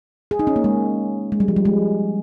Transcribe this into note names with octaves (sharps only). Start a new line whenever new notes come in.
G#4
D#4
C#4
A#3
G#3
G#3
G3
F3
G3
G#3